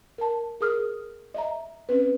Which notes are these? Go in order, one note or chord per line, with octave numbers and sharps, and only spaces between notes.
A#4 A5
G#4 A#4 D#6 F6
D#5 E5 A#5
C4 C#4 B4